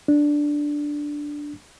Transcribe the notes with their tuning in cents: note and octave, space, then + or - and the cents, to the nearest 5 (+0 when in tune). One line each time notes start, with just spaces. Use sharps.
D4 +0